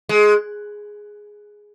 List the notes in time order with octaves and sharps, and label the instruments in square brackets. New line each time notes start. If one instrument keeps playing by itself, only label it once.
[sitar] G#3